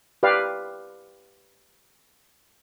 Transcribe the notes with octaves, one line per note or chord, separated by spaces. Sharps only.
G4 B4 D5 F5